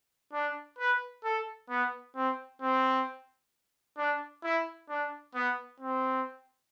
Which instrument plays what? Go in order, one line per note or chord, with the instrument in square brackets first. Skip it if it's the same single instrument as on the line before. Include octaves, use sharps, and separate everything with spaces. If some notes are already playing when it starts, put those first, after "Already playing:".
[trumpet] D4
B4
A4
B3
C4
C4
D4
E4
D4
B3
C4